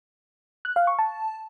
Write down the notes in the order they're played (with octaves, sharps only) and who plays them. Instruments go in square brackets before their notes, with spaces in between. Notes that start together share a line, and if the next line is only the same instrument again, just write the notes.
[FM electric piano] F#6
F5
C#6
A5